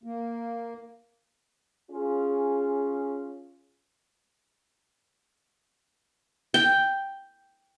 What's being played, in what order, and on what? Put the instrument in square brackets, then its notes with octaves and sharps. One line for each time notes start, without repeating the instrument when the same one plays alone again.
[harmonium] A#3
[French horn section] C#4 F4 G#4
[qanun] G5